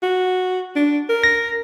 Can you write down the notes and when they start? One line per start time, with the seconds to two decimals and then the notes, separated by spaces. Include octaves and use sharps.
0.02 F#4
0.76 D4
1.09 A#4
1.24 A#6